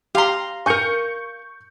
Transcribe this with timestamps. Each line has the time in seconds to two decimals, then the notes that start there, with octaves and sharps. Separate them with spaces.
0.15 G4 F5 A#5 C6
0.66 A#4 G#5 C#6 G6 C#7